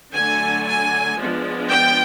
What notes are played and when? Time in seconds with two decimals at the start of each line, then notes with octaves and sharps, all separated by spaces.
0.14 D3 F#3 A3 G#5
0.66 G#5
1.17 F3 G#3 B3 D4
1.69 G5